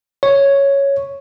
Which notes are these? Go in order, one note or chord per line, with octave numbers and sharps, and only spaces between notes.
C#5